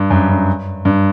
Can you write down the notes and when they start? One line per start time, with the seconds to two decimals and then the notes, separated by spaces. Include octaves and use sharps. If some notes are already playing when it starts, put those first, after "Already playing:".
Already playing: G2
0.10 F#2
0.29 G2
0.85 G2